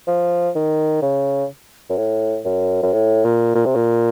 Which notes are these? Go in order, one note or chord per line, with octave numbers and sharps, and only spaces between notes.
F3
D#3
C#3
F#2
A2
F#2
F#2
A2
A#2
A#2
C3
A#2